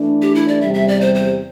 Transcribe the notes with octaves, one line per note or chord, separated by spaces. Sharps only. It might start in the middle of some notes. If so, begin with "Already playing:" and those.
Already playing: E3 A3 D4
G4
E4
D5
E2 C3 G3 E5
E5
D5
C5
C5